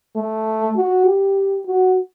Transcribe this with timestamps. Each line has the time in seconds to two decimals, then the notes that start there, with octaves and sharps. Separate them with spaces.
0.16 A3
0.76 F#4
1.06 G4
1.66 F#4